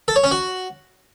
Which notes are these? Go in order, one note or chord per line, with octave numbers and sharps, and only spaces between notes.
A4
C#5
C#4
F#4